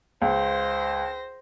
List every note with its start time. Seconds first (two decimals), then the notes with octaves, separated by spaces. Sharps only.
0.22 C#2 C5 A#6